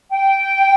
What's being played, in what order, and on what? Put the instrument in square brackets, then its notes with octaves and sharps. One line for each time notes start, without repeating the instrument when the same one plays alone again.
[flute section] G5